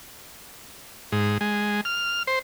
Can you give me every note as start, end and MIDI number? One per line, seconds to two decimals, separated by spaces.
1.12 1.38 44
1.41 1.81 56
1.85 2.23 89
2.27 2.39 72